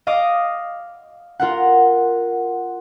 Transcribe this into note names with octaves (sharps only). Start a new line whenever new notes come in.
D#5 F5 D6 D#6
F4 A#4 F#5